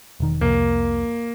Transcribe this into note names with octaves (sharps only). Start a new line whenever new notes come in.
E1 D#3
C2 F2 A#3